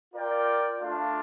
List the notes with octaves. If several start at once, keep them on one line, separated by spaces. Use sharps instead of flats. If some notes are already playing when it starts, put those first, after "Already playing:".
F4 A#4 D5 G5
A3 D4 F4